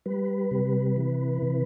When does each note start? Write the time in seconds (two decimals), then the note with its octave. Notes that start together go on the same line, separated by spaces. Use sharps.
0.06 G3 B4
0.51 C3
0.97 E3
1.42 C3